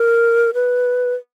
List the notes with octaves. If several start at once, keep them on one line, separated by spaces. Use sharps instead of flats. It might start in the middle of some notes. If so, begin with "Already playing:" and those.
Already playing: A#4
B4